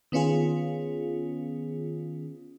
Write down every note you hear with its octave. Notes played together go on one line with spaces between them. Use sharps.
D#3 B3 C#4 F4 G#4